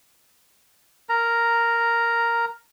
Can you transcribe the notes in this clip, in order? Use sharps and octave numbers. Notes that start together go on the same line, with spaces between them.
A#4 A#5